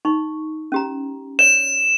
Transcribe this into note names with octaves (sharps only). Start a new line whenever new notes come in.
D#4 C#6
C#4 G4 A#5
C#5 D5 E7